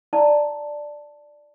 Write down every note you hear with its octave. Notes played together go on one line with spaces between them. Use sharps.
E4 D5 A5